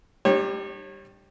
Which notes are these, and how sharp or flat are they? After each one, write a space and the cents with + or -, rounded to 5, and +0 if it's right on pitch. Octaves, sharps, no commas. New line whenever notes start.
G3 +0 D4 +40 C#5 -30